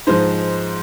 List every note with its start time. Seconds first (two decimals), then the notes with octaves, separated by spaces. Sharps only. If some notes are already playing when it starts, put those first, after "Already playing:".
0.07 G#2 F3 G#3 D#4 C5